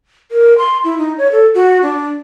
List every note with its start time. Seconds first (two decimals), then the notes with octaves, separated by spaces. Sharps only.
0.31 A#4
0.58 C6
0.84 E4
0.98 D#4
1.18 C#5
1.32 A4
1.55 F#4
1.83 D4